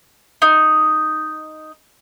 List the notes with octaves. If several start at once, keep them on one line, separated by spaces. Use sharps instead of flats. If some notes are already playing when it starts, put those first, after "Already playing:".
D#4